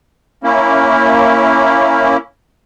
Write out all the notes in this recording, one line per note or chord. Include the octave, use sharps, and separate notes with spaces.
A#3 C#4 E4